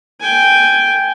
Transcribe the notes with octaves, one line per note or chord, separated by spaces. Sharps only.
G5 G#5